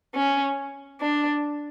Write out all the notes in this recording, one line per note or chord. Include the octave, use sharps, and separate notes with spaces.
C#4
D4